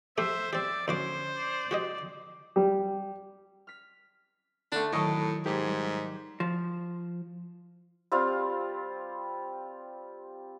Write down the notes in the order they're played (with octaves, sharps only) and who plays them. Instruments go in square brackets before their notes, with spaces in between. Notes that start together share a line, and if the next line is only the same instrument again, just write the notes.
[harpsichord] A3 G4 [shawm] C5 [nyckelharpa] E5
[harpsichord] C4 G4 [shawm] D5 [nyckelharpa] E5
[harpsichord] D2 F#4 D6 [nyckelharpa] C#4 [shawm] C5
[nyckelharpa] D5
[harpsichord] F#4 G4 D#5
[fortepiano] G3
[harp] F6 B6
[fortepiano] D3 A3 [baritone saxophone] D4
[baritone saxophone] A2 [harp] D#3 F#3 [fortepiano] A4 D#5 C#6
[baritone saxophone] G#2 [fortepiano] G4 [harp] A#4 C6 G#6
[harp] F#3 G3
[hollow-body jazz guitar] F3
[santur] G3 C4 F4 F5